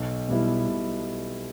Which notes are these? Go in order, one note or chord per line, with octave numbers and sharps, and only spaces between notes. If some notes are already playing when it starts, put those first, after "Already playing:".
Already playing: B1
B2 G3 B3 E4
B1